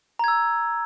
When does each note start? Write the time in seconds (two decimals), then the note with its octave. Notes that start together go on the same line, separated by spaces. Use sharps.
0.19 A#5
0.24 G#6
0.28 E6